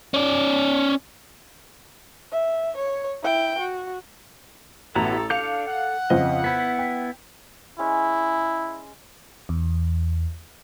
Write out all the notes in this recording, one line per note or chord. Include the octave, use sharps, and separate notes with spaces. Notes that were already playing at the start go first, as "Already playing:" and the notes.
C#4 D5
E5
C#5
E4 G5
F#4
A1 B3 E4 F#4 A4 A#5 F7
D4 A4 F5 D6 G6 C#7 F7
F#5
F2 C#3 C5 D#5
B3 E4 B6
G5
G#3 C#4 E4 G#5
E2